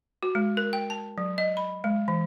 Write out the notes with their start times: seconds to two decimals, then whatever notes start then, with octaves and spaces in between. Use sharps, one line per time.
0.23 F#4
0.35 G#3
0.57 A#4
0.73 G5
0.90 A5
1.18 F#3
1.38 D#5
1.57 B5
1.84 G#3
2.08 E3